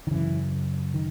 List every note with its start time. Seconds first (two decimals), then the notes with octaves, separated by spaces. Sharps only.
0.07 D#3
0.11 F#2 C#3 E3
0.94 D#3